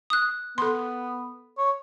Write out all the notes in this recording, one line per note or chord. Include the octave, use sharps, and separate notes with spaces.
D#6 F#6
B3 A4 C6
C#5